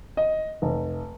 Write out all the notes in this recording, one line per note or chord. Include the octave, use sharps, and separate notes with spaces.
D#5
F1